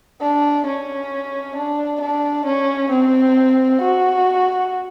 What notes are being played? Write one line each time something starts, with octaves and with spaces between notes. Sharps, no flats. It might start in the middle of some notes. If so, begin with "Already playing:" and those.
D4
C#4
D4
D4
C#4
C4
F#4